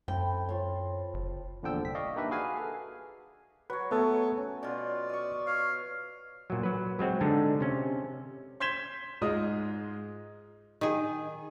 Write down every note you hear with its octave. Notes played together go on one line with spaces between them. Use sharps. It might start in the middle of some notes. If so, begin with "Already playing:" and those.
F#2 C4 E4 A4 G5
F4 C#5 F5
F#1
E2 A#2 D3 F3 G5 E6
C2 B6
D5 D#5 F5 G5 C#6
A#3 D4 D#4 G4 B4 E5
F#4 G#4 B4 F5 G#5
A4
F#3 B4 C#5
A3 B3 A4
C#4
B2 F4 D5
D#5 C#6
C#5 F5
A#2 F#3
F#3 B4
F#3 G#3 C4 F#4
D3 G#3 D4 D#4
C3 C#4
C6 G6 G#6 B6 E7 G7
G#2 G#3 F4 D#5 D#6
D#3 G#4